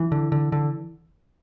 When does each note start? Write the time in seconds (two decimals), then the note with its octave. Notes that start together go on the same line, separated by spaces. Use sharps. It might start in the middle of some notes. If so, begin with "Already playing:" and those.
Already playing: E3
0.12 D3
0.32 D3
0.52 D3